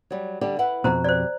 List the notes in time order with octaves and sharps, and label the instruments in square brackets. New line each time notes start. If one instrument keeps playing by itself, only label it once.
[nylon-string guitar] F#3 G3
D3 G3 G4
E4 B4 F#5
[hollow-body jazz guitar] F2 B2 [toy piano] C5 A#5
[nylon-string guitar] G4 [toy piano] C5 D5